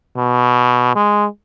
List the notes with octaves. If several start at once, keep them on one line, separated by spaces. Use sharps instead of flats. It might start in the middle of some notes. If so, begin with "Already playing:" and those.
B2
G#3